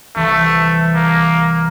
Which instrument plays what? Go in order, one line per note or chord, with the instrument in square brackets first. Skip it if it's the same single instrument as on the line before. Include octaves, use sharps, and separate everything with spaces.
[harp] C2 E3 B5 [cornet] A3
[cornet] A#3